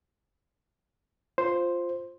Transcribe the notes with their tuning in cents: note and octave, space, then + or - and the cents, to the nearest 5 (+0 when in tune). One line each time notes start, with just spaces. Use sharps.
F4 +0 C5 +0